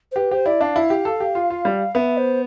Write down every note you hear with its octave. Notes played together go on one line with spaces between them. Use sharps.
C5
G4 B4
G4 C5
E4 D5
D4 F5
E4
G4
A4
G4
F4
F4
G3
B3 E5
C5